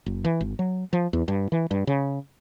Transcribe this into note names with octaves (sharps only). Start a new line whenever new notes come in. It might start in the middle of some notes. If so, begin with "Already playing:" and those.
F#1
E3
G#1
F#3
F3
E2
G2
E3
G2
C#3